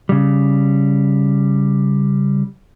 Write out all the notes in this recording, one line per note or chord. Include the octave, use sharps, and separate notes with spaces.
C#3 G3